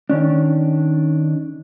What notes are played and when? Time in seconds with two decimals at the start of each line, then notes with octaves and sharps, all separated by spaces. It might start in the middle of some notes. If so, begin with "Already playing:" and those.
0.09 D#3 C#4 D4